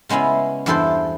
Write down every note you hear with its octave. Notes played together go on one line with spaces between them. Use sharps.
C#3 G#3 B3 C#4 E4
E2 G2 E4 A4 C5 G5